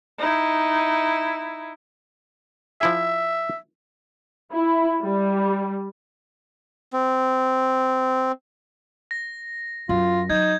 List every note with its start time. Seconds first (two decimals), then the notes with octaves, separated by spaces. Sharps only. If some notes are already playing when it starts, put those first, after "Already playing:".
0.18 D#4 E4
2.81 F3 E4 G#4 E5
4.53 E4
5.02 G3
6.93 C4
9.11 A#6
9.89 F#2 F4
10.30 F#3 D#4 G6 G#6